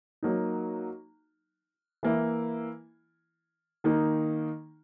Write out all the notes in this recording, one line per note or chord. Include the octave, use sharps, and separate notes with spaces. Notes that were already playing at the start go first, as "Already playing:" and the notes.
F#3 A#3 D#4
E3 A#3 E4
D#3 A#3 D#4